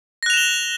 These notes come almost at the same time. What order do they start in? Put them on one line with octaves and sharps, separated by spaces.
A#6 F#6 F7 E7 G7